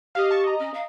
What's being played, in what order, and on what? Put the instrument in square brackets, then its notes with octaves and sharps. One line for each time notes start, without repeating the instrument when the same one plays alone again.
[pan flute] G4 [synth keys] D#5 F5
[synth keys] A5 C#6
D#5 A#5
[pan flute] C#4
F5